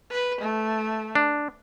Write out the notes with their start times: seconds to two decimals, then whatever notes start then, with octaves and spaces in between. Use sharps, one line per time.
0.11 B4
0.41 A3
1.15 D4